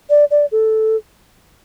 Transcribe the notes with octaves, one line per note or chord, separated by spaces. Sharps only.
D5
D5
A4